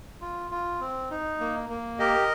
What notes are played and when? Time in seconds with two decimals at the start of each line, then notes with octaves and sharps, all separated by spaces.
0.21 F4
0.51 F4
0.80 C4
1.10 D#4
1.40 A#3
1.69 A#3
1.99 G4 A#4 D#5